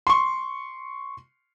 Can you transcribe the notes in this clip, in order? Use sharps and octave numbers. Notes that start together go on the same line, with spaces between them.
C6 C#6